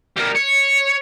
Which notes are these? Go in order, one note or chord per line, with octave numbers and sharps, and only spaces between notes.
G3 A#4
C#5